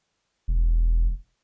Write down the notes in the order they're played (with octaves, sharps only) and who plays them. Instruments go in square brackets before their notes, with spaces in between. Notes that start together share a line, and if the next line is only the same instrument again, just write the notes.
[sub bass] E1